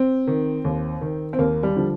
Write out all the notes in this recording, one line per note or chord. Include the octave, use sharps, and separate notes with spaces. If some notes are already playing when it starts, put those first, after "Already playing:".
Already playing: C4
D#3
D#2
D#3
C4
D#2 A#3
G3
D3 F3